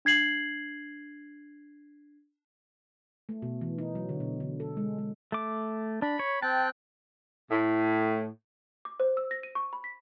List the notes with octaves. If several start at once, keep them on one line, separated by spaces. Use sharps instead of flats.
D4 G#6 C7 F#7
A3
B2
E3
D#4
F#3
D3
B2
D3
A4
G#3
G#3
A3 D6
D4 B5
C#5
C4 G5 A5 F#6
A2
D6
C5
E6
A#6
D#7
C#6
B5
B6